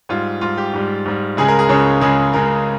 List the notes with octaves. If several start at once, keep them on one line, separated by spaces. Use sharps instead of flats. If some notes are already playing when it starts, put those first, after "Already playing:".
G#2 G3 F4
G#2 G3 F4
G4
G#2 G3
G#2 G3
C#2 C#3 G#3 G#4
A#4
G#4
C#2 C#3 G#3 C#4
C#2 C#3 G#3 G#4
C#2 C#3 G#3 A#4